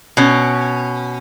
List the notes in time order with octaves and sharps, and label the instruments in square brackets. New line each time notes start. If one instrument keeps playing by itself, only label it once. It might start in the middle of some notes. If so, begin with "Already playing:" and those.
[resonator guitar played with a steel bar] B2 C#4